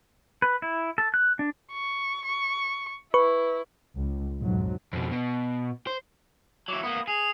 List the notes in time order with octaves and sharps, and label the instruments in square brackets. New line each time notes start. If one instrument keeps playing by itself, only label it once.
[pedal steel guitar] B4
E4
A4
F#6
D4
[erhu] C#6
C#6
[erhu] E4 [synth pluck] B4 C#6
[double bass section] C#2
B1 F2 G#2 F#3
[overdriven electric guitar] F2 B2
B2
C5
[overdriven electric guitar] F#3 E4 [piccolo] D6
[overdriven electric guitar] A#3 B3 [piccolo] D#6
[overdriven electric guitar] G#4 [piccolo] F7